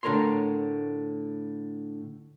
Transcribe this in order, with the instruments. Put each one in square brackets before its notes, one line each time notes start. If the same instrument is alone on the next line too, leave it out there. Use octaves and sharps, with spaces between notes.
[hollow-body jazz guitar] A2 D3 A#4 C#5 C6